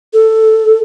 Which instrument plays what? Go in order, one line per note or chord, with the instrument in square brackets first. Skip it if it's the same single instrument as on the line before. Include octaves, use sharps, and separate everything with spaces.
[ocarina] A4